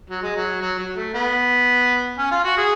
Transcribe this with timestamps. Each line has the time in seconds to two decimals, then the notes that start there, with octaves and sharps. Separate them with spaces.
0.10 F#3
0.23 G#3
0.36 F#3
0.62 F#3
0.78 F#3
0.96 A3
1.14 B3
2.18 C#4
2.31 F4
2.44 F#4
2.57 G#4